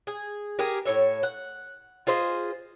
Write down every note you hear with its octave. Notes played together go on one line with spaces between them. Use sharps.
G#4
G4 G#4 A#4
A2 C#5 E5
F#5
F4 G#4 C5 D#5